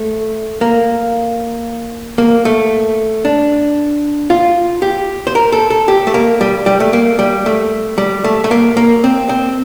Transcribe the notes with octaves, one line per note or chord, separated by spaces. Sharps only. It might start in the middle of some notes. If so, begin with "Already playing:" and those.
Already playing: A3
A#3
A#3
A3
D4
F4
G4
C5
A#4
A4
A4
G4
A3
A#3
G3
G3
A3
A#3
G3
A3
G3
A3
A3
A#3
A#3
C4
C4